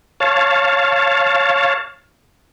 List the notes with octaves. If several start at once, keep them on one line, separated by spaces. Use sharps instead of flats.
C#5 F5 A5